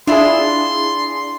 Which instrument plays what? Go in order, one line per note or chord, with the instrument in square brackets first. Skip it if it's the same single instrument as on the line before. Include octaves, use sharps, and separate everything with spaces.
[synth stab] D4 E4 G#4 [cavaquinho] F4 E5 B5 [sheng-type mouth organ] C6